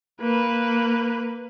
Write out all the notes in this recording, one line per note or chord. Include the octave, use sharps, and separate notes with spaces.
A#3 B4